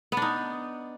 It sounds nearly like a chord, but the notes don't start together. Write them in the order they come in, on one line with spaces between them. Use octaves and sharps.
B3 D4 D#4